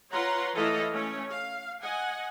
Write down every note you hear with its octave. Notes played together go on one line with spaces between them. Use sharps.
F4 B4 C#5 F#5 A#5 C6
E3 A3 E4 A4 D#5 F5
A3 C#4 C#5
F5
D#5 F#5 G#5